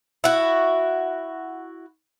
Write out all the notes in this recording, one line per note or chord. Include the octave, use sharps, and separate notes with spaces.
E4 F#4